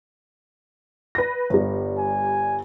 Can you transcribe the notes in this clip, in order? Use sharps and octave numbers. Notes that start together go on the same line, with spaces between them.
B4 A#6
G1 G3
G#5